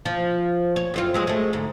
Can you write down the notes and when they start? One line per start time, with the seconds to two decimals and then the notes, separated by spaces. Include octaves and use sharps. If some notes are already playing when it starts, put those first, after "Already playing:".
0.05 F3
0.76 C#5
0.94 F#2 C4 F4
1.14 F#3 G#3 C4
1.27 G#3 A3
1.53 D2 G#2